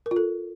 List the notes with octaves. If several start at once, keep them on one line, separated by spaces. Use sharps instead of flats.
A#4
F4
A4